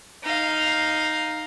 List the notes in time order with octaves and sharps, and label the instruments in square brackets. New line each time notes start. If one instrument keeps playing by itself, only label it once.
[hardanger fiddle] D#4 F5